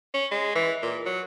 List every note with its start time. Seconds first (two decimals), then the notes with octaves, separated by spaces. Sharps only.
0.14 C#4
0.31 G#3
0.55 E3
0.82 A#2
1.05 F#3